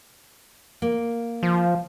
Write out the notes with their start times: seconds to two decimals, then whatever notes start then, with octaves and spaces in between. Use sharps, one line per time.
0.82 A#3
1.43 F3